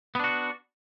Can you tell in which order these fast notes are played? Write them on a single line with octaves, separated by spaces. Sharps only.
B3 D4 F#4